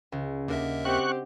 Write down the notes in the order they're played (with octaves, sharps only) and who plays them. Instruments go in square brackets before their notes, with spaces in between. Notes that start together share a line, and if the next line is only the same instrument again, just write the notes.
[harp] C#2
[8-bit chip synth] D#2 A#4 E5 [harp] D4 D#4 F#4
[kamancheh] C4 G4 [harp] F#4 [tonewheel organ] C#6 F#6